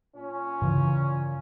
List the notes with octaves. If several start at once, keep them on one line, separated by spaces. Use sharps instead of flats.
A#2 C#4
G2 C#3 E3